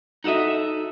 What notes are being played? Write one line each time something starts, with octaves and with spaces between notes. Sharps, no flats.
D#4 F#4 A4 D#5 E5